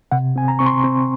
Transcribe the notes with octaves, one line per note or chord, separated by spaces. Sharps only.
C3 F#5
C4 G#5
A#5
C4 C#6
C6
C4